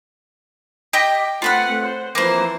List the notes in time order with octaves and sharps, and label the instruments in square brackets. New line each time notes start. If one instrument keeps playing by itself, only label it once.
[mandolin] G4 D#5 G5
[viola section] A3 C4 F#5 [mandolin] F4 B4 F6
[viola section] C5
[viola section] E3 F3 C4 [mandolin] A#3 C5